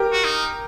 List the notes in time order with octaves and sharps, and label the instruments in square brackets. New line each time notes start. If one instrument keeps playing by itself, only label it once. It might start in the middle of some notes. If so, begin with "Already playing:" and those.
Already playing: [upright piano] G4 A#4
[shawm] F#4
D#4